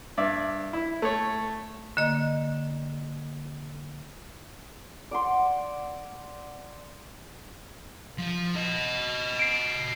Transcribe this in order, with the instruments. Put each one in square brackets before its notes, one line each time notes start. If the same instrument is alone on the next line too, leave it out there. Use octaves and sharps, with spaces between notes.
[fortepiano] G2 D5 E5
E4
A3 C#5
[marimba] D3 A#3 D#5
[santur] D5 F#5 C6
[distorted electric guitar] F3
F#4 D#5
[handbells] C7 D7